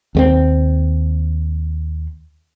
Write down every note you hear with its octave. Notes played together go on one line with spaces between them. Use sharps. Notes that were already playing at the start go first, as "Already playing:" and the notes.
D#2 A3 C4